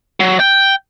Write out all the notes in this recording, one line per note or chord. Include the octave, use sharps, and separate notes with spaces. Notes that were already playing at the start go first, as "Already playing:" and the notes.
F#3
G5